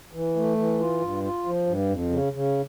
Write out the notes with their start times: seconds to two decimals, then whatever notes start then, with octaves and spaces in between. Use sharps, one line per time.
0.13 E3
0.36 A3
0.57 E3
0.80 F4
1.01 G2
1.24 F4
1.45 F3
1.66 G2
1.89 F2
2.11 C#3
2.33 C#3